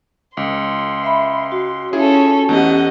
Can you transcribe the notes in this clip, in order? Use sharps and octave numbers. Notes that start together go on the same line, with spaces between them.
C#2 C6
E5 B5
F#4
C#4 E4 F4 G#4 A4
E2 A3 C#4 G4 D#5 F#5